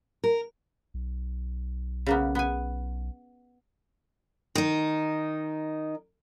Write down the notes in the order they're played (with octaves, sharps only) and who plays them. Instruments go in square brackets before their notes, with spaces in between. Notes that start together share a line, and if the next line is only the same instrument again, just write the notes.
[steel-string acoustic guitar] A#4
[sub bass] B1
[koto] C#3 A#3 B3
B3 G#5
[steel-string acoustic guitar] D#3 D#4